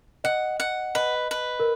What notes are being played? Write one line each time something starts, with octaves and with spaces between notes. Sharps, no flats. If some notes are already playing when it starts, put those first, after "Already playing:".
D#5 F#5
F#5
B4 D#5
B4
A#4